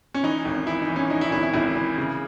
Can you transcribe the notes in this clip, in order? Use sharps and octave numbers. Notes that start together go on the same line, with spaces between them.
C#4
E3 D#4
G#1
E3 E4
D#4
E3
C#4
E3 D#4
E4
G#1 E4
E4
G#1 E4
E3
C#3